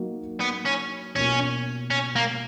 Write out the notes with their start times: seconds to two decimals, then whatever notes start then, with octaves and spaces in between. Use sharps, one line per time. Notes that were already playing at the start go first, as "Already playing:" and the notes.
Already playing: F#3 A#3 D#4 F#4
0.41 B3
0.66 C#4
1.16 B2 A#3 C#4 F4
1.90 C#4
2.16 A#3